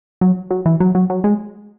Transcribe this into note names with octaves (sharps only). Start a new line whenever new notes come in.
F#3
F#3
E3
F#3
F#3
F#3
G#3